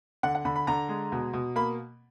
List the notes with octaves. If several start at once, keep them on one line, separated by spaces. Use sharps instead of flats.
D3 F#5
F#5
D3 B5
B5
D3 A#5
G#3
B2
B2
A#3 B5